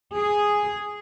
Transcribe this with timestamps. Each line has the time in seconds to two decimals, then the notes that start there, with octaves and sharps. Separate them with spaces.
0.17 G#4